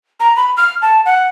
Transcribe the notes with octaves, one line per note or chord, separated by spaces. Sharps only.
A#5
B5
F6
A5
F#5